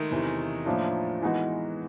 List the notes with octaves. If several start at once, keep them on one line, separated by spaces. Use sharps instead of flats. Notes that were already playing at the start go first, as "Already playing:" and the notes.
Already playing: D#3 G#3 A3
E2 C3 E3
A2 F3 A#3 D4
E3 G#3 B3 D#4 F#4